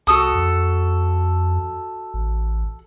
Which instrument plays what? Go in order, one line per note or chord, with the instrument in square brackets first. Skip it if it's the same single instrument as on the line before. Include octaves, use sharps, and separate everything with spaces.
[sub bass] C2 [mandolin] F#4 A4 D#6
[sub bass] F2
A1